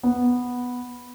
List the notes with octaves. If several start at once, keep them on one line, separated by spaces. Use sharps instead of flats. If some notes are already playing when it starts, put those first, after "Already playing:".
B3